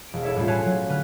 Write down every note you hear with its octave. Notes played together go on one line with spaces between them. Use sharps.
E1 D7
E4 A4 C#5 E5
A2 G3 C#4 E4 F4
B4 C#5 F5 G#5 A5
F#3
D3 B4 F6